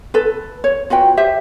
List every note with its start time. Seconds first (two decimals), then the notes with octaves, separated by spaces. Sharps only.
0.14 A4 B4
0.64 C#5
0.90 F4 F#4 B4 G5
1.17 G4 C5 E5